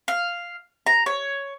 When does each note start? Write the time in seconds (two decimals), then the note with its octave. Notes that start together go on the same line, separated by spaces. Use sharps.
0.08 F5
0.86 A#5
1.06 C#5